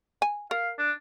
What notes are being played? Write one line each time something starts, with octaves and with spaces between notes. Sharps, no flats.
G#5
A#4 F5
D4